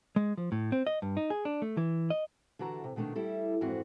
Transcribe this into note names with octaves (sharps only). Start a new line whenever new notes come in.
G#3
F3
A2
C4
D#5
G2
D#4
G#4
D4
A3
E3
D#5
D3 E3 F#4 A5 A#5
C3
B2 D#3 A3 A#3 D4
G3 E4 A4
F2 G#2 E3 C4 F#4